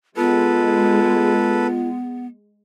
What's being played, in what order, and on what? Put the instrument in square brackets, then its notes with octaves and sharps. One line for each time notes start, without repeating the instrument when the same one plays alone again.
[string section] G#3 [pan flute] B3 [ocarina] F4 [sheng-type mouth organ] A4 B4